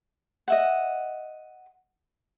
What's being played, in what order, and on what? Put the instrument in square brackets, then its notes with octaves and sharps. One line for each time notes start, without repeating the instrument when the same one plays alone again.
[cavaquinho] D#5 E5 F#5